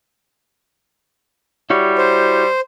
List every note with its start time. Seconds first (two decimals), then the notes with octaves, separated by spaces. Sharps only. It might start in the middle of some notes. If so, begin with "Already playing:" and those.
1.70 G3 E4 F#4 C#5
1.98 C5